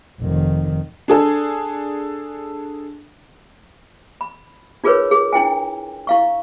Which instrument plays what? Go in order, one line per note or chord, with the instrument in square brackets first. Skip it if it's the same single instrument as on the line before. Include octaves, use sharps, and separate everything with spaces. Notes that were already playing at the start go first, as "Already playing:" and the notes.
[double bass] F1 D#3
[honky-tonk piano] D4 G#4 A4
[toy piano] B5
D#4 F4 G#4 A#4 B4 C#5
G#4
D4 E4 G5 G#5
E4 F5 C#6